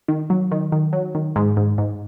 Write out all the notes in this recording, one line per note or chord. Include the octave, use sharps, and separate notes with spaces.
D#3
F#3
D#3
D#3
F#3
D#3
G#2
G#2
G#2